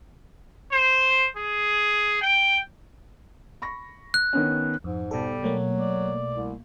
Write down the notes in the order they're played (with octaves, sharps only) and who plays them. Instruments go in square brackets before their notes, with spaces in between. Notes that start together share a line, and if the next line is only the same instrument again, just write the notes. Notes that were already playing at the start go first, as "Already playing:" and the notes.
[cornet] C5
G#4
G5
[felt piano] B5 C#6 A#6
[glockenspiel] F#6
[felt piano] D#3 B3 C#4
[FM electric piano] F2 [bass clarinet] G#2
[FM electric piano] B2 A4 [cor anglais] G3
[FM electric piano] B2 A3 A#3 [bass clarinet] F#3
[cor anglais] D5
[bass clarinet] C2